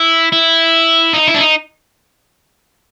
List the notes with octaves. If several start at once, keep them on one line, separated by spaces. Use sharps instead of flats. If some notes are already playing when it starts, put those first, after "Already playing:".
Already playing: E4
E4
D#4
E4
D4
D#4